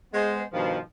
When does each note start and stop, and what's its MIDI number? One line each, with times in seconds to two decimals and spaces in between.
0.14 0.43 56
0.14 0.43 59
0.14 0.43 72
0.53 0.78 43
0.53 0.78 47
0.53 0.78 51
0.53 0.78 53